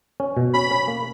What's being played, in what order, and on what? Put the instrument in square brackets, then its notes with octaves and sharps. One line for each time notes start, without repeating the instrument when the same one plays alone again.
[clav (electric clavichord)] C#4
B2
[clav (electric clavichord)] C#4 [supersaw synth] B5
[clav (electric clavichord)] C#4
A#3